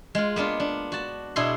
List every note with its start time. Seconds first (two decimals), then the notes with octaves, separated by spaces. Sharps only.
0.15 G#3 F4
0.36 A#3 B3 D4 F4
0.60 D4
0.92 F#4 A5
1.36 B2 D4 E4 G#4 C6